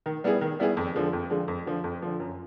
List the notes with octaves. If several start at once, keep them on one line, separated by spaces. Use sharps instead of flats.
D#3
G3 B3 E4 G#4
D#3
G3 B3 E4 G#4
F2
D3 F3 G#3
F2
D3 F3 G#3
F2
D3 F3
F2
D3 F3
F#2